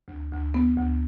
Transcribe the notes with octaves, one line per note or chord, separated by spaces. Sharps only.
D2
D2
B3
D2